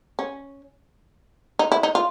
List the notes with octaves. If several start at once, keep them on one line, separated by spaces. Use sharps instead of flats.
C#4
D#4
E4
D#4
F4